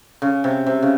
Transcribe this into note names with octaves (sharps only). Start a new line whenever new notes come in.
C#3
C3
C3
C#3